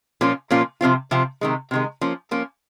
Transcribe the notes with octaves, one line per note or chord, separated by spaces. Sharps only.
A#2 F3 A#3 C#4 F4
A#2 F3 A#3 C#4 F4
C3 F3 C4 F4
C3 F3 C4 F4
C3 D#3 G#3
C3 D#3 G#3
F3 A#3 C#4
F3 A#3 C#4